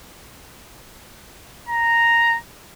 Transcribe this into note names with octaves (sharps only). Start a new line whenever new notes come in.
A#5